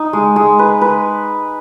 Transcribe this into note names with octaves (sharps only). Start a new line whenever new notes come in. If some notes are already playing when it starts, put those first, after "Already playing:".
Already playing: D#4
G#3
G#3
B4
B4